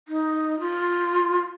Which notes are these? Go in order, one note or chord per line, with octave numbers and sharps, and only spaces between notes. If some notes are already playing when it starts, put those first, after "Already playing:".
D#4
F4